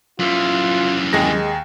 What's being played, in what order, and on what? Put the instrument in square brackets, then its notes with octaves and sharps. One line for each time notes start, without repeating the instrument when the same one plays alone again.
[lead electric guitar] F#2 E3 [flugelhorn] F4
[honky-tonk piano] D#2 G#4 A#6 [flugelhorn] G#3